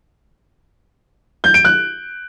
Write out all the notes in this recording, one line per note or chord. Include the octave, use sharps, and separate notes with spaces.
G6
D7
F#6